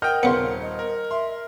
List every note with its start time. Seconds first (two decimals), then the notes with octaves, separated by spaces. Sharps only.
0.02 A#4 D#5 F#5 G5 F6 G6
0.23 D#1 C#3 B3 C6 C#7
0.61 D#5
0.79 A#4
1.11 E5 C6